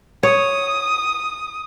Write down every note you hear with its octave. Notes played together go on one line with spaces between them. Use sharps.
C#5 D#6